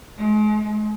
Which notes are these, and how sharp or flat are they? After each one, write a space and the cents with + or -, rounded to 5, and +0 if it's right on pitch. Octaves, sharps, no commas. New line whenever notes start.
G#3 +40